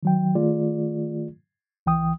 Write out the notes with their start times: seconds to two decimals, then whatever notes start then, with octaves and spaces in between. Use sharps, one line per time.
0.03 D#3 F#3 G5
0.35 D#3 A3 F4 G#4 D5
1.86 C#2 E3 G5 D#6